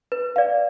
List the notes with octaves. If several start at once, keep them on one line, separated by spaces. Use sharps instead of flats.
B4
D5 F5